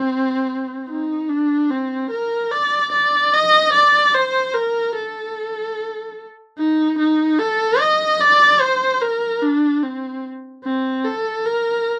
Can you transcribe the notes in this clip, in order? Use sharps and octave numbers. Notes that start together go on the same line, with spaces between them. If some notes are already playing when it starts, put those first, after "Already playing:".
Already playing: C4
D#4
D4
C4
A#4
D5
D5
D#5
D5
C5
A#4
A4
D#4
D#4
A4
D#5
D5
C5
A#4
D4
C4
C4
A4
A#4